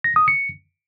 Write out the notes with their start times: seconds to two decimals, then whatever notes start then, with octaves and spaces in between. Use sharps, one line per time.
0.04 A#6
0.16 D#6
0.28 C#7